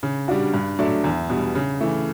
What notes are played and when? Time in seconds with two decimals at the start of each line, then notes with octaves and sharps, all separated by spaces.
0.03 C#3
0.28 G3 D4 F#4
0.54 G2
0.79 F#3 A3 D4
1.04 E2
1.30 B2 G3
1.55 C#3
1.81 E3 A3